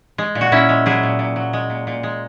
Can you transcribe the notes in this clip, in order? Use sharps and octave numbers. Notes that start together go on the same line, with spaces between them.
G#3
A#2
F#4
A#2 C#4 E4
G#3
F#3 E4 G#4
A#2
A#2
F#3
G#3
A#2
A#2
G#3